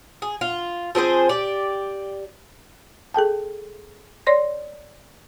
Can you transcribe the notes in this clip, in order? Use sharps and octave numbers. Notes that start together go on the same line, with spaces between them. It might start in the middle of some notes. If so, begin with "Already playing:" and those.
G#4
F4
F3 C4 G#4 C5
G4 D5
G#4 A4 G5 A5
C#5 D5 C6 A#6